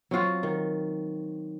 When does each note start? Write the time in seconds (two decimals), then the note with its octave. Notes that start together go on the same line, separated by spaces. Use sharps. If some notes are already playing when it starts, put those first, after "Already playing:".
0.11 F#3 C4 F4 F#4
0.43 D#3